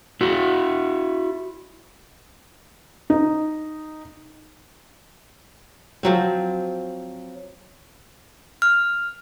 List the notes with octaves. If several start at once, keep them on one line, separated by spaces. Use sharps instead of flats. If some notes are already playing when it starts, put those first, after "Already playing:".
E4 F#4
D#4
F3 F#3 C4
F6